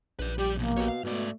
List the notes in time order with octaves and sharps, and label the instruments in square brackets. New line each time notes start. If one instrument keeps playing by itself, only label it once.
[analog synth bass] A#1 [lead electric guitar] B4 D5
[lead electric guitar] G3 D5 [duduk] G4
[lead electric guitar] F#2 B2 [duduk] A#3
[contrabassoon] B2 [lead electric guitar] G4 C#5
[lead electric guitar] F5
[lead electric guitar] G#2 D5 [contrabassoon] B2 [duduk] A3